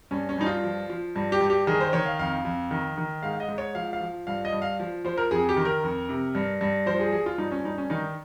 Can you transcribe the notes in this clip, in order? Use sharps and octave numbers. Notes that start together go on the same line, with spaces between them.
G2 C#4
C#4
G2 D#4
F4
F3
F3
G2
G4
G2
G4
D#3 G#4
C5
D#3 C#5
F5
F2 F5
F2
D#3
D#3
G#2 F5
D#5
G#2
C#5
F3 F5
F5
F3
G2 F5
D#5
G2
F5
F3
F3 C5
A#4
F2 G#4
G4
D#3
A#4
F2
C3
G2
G2
F3 C5
G#4
F3 G#4
F4
G2 D#4
C#4
G2 D#4
C#4
D#3 D#4